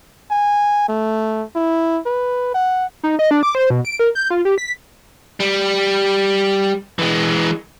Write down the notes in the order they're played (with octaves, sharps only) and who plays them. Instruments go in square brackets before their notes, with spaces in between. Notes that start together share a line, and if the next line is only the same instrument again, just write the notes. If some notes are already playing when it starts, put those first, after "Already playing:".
[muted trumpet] G#5
A3
E4
B4
F#5
[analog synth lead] D#4
D#5
D4
D6
C5
B2
D7
A#4
G6
F4
G4
B6
[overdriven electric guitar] G3
E3 G#3